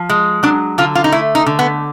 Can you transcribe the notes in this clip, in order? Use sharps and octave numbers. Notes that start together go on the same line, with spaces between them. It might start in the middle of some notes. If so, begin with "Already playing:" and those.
Already playing: F3
G#3
F#3 D4
D3 F4
F4
D#4
A3 E4
D#4
D3
B3